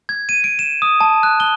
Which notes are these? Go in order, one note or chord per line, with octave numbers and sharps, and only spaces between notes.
G#6
D#7
D7
E7
D#6
A5
F#6
G7